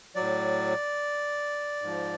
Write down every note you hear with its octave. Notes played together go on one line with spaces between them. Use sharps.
A2 F#3 D5
G#2 F3